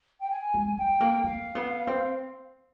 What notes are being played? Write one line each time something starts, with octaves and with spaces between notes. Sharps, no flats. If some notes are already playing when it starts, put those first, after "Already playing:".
G5
G#5
G#3
A3 G5
A#3
A#3 F5
B3
C4